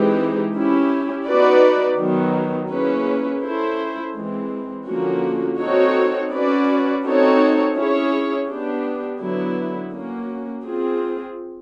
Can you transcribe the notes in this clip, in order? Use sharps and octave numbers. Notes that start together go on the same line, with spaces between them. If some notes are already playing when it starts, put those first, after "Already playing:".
Already playing: E3 G#3 C4 D#4 G4
C#4 E4 G4
B3 D#4 F#4 B4 D5
D#3 F#3 B3
A#3 C#4 E4 G#4 B4
C#4 E4 A4 C5
E3 G#3 C4
D3 F3 A#3 C#4 F#4
C4 D#4 F#4 A4 C#5
C#4 F#4 B4 D5
C4 D#4 F#4 A4 C#5
C#4 E4 G#4 C#5
B3 D4 G4
D3 F#3 B3 E4
A#3 C#4 F#4
C4 F4 G#4